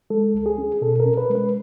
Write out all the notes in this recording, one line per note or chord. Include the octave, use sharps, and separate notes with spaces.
G#3 A4
C#2
G#4
C#4
B2 A4
A#4
C#4
B4
G#3
B4